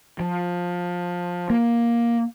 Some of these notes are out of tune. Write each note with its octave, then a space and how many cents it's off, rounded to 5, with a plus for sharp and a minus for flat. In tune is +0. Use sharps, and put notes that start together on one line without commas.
F3 +15
A#3 +10